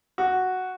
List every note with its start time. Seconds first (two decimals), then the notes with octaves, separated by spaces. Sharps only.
0.18 F#4